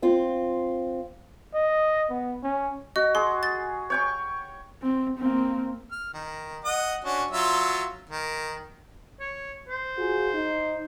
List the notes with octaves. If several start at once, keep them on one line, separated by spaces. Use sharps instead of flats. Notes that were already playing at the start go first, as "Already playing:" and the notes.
C4 F4
D#5
B3
C#4
F#4 D#5
G#4 C6
A6
C#5 G5 C#6
C4
A#3 C4
F6
D#3
D#5 F#5 D#6
C#4 D4 F#4
F#3 F4 E5
D#3
C#5
C5
F4 F#4 G#4
D#4